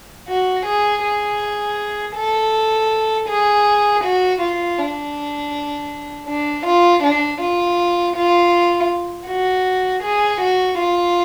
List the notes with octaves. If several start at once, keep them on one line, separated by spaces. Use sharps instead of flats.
F#4
G#4
G#4
A4
G#4
F#4
F4
D4
D4
F4
D4
F4
F4
F#4
G#4
F#4
F4